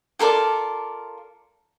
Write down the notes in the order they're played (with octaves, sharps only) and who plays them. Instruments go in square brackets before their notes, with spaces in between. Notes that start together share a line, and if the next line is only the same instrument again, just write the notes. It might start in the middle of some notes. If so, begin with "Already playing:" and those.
[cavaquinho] F4 A4 A#4 D5